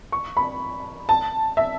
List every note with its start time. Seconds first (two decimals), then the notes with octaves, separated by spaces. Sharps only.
0.12 C#6
0.37 B5
1.09 A5
1.57 E5